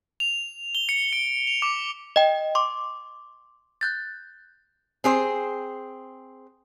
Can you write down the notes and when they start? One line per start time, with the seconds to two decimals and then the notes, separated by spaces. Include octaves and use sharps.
0.20 F7
0.75 G7
0.89 C#7
1.13 D7
1.47 F7
1.62 D6
2.16 D#5 G5
2.55 C6 D6
3.81 F#6 G6 A6
5.04 C4 G#4 C5